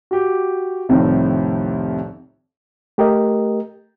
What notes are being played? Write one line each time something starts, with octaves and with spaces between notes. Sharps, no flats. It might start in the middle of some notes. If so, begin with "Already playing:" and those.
F#4 G4
C2 F2 A2 C3 D#3 F3
A3 G4 A#4 D#5